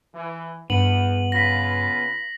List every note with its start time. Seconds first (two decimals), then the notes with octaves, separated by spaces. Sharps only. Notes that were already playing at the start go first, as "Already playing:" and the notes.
0.15 E3
0.70 E2 G2 B3 F#7
1.32 C#3 F4 B4 A#6 B6